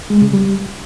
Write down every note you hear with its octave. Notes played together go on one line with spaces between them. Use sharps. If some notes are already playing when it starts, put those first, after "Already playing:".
G#3
C#3
G3